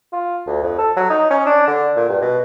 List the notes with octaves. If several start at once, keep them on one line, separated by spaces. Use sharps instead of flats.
F4
D2
F2
A4
F#3
D#4
C#4
D4
D3
A#2
G2
B2